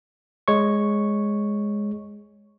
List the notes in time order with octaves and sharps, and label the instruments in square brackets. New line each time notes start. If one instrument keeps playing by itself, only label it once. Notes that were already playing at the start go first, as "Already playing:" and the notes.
[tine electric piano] G#3 C#5 C#6